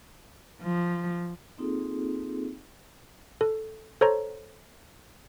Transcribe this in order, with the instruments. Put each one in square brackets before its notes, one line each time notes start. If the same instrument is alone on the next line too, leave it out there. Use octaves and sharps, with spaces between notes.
[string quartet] F3
[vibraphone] A#3 C4 D#4 F4 G#4 A4
[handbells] A4
A4 C5 C#5 A#5